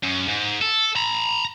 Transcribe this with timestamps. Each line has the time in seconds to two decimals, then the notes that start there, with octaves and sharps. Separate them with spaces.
0.03 F#2
0.28 G#2
0.61 A4
0.96 A#5 B5